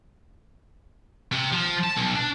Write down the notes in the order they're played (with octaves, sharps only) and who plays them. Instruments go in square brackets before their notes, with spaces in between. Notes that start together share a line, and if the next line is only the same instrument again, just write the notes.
[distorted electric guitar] C3
F3
A5
B1
D4